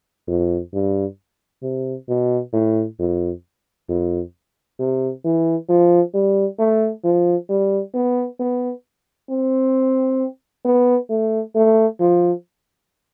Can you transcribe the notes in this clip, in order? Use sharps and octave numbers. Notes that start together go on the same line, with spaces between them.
F2
G2
C3
B2
A2
F2
F2
C3
E3
F3
G3
A3
F3
G3
B3
B3
C4
B3
A3
A3
F3